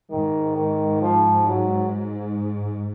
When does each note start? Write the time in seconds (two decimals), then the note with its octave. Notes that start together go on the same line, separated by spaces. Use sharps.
0.11 G#2 D#3
0.57 D#3
1.02 F3
1.48 F#3